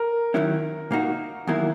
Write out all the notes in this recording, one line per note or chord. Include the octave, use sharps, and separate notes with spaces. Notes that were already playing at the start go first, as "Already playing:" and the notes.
Already playing: A#4
D#3 F#3 C#4 E4
A#2 A#3 D#4 F#4
E2 D#3 F#3 A#3 E4